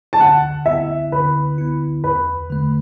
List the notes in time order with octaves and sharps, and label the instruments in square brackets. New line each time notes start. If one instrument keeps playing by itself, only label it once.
[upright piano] A5
[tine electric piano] D3 [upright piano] F#5
[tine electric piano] B3 E4 [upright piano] E5
[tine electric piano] D3 [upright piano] B4
[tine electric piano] B3 E4
[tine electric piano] E2 [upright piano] B4
[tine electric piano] D3 A3